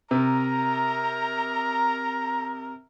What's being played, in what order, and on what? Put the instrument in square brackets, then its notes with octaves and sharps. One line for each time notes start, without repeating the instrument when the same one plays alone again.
[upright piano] C3 [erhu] A#4 [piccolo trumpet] A#5